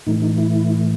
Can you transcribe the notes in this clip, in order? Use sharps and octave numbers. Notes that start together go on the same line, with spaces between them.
A2 E3 A3 D#4
D#4
E4